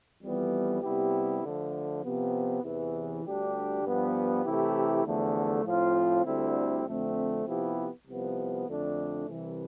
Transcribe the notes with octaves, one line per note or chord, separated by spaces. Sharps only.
F2 E3 G3 B3
C3 G3 B3 E4 G4
D3 F3 A3
C3 F3 B3
E2 C3 E3
D2 D3 G3 D4 G4
G2 F3 B3
C3 E3 A3 E4 G4
E2 D3 F3 A3
A2 F3 C4 F4
D2 D3 G3 C4 E4
F2 D3 A3 C4
C3 F3 B3 E4 G4
C2 C3 F3 B3
F2 D3 A3 D4
C2 C3 E3